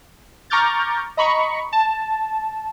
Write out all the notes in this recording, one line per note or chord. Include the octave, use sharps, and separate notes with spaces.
A#5 C#6 D6 F6 G6 A6
D#5 A#5 B5 C#6 C#7
A5